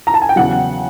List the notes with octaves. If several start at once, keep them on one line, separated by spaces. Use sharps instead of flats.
A#5
A5
G#5
G5
E2 C#3 F#3 F#5